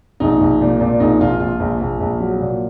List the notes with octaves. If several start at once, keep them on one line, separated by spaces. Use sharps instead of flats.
A#1 D#4
A#1
A#2
A#2 D4
A#1 D#4
A#1 F4
A#1 F4
A#1
A#1
A#1
F#3
A#2